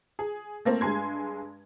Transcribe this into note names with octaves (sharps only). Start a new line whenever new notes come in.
G#4
A3 A#3 C4
G2 G#3 G#5 C6 G#6